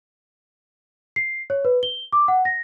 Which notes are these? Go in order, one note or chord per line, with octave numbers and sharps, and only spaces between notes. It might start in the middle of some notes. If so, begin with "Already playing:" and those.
C7
C#5
B4
G7
D6
F#5
A#6